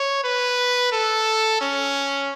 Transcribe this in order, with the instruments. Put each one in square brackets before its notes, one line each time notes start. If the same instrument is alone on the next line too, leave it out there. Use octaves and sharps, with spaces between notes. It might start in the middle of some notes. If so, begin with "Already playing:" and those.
Already playing: [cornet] C#5
B4
A4
C#4